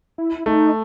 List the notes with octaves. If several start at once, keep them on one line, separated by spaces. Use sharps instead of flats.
E4
A3 D#4